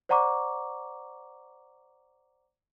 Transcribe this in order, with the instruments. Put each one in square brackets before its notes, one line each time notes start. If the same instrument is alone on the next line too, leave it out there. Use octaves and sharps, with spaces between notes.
[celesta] C5 D5 F#5 A#5 C#6 D6